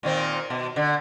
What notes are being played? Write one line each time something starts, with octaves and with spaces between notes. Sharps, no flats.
A#2 D#3 C4
B2
D3